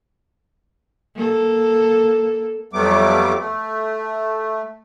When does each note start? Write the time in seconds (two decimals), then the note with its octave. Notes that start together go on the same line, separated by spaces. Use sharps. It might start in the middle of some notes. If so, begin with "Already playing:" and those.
1.15 A#3 A4
2.73 F2 F#3 G3 A3 B3 D6
3.38 A3